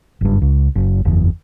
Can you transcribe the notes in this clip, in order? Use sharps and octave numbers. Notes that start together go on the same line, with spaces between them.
F#1 G2
C#2
F#1
F#1 E2 E3